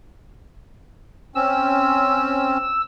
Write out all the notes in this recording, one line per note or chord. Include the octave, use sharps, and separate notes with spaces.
C4 C#4 E6